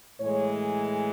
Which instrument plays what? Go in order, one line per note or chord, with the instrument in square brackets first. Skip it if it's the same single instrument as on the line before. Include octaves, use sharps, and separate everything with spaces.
[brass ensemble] A2 E3 G#3 C#5